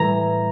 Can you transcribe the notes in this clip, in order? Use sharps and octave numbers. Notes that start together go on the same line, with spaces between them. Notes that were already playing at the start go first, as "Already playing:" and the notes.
Already playing: A2 E3 G3 G#5 A#5